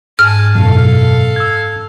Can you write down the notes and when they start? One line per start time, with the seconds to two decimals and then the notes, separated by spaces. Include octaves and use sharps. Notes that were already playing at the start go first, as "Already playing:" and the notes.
0.19 G#2 G#5 A5 F6
0.55 F#2 B2 A4 F5
1.36 E6 G#6